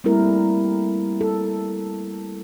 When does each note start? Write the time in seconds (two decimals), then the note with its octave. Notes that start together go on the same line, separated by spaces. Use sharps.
0.04 G3 A3 A#3 C4 E4 A#4
1.21 A4